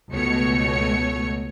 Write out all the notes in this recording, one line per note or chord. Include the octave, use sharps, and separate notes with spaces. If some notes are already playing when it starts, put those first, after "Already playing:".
C#2 B2 A3 C#5 C#7